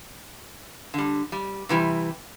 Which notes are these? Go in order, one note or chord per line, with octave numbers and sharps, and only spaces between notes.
D3 G3
G3
C3 E3 G3